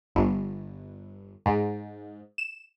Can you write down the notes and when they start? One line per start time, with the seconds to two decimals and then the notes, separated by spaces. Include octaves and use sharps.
0.15 G1
1.46 G#2
2.38 E7